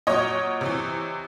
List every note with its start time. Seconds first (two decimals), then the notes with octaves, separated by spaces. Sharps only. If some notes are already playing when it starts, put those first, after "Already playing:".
0.07 A#2 F#3 C#5 D#5
0.61 C3 E3